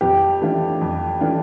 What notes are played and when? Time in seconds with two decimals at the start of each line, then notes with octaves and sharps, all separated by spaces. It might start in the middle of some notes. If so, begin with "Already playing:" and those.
0.01 F2 G4
0.41 E3 A3 D4 F4
0.81 F2
1.20 E3 A3 D4 F4